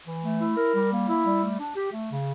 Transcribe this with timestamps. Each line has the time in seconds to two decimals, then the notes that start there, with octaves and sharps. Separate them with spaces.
0.07 E3
0.23 A3
0.40 E4
0.57 A#4
0.74 G3
0.92 A#3
1.08 E4
1.25 G3
1.42 A3
1.59 D4
1.76 G4
1.92 A3
2.10 C#3